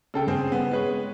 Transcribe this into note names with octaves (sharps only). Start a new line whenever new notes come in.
C#3 A4 G5
G2 C#3 C4 G#4 C5
B3
G#3 B4 C#5